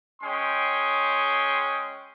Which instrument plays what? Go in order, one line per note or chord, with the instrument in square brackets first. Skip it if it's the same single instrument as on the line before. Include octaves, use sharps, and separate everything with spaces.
[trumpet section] G#3 C#4 G5 C6 D#6